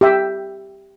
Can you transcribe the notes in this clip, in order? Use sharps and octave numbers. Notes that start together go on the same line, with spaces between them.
G4 E5